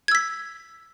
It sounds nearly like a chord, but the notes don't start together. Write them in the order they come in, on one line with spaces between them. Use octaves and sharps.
G#6 E6 B6